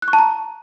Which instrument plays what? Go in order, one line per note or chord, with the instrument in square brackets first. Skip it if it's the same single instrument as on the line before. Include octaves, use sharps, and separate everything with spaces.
[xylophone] F#6
C#6
A5
A#5